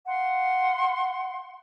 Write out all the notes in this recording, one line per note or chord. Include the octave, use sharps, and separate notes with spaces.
F5 F#5 C6